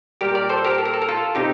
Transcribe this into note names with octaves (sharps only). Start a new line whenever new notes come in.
A#2 G3 G4 A#4
A#4 D5
A4 C5
G4 A#4
A4
A#4
A4
A#4
F4 A4
C3 D#4 G4